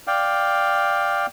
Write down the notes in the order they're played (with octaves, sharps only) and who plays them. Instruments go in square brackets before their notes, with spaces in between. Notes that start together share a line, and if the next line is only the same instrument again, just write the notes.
[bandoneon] D5 F5 G5